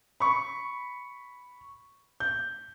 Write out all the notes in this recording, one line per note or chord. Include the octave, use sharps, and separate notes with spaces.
B5 C#6
G6